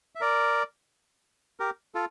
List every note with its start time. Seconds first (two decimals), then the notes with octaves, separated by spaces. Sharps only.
0.15 E5
0.21 A#4 D5
1.60 G4 A#4
1.95 F4 A4